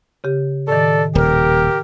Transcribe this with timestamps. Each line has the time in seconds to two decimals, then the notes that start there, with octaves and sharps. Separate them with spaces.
0.24 C#3 G4
0.68 A2 D#3 A4 D5
1.15 D#1 G4 A#4